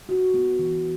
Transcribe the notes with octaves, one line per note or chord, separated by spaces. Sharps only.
F#4
B3
E3